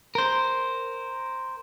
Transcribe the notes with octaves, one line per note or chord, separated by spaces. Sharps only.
A#4 C5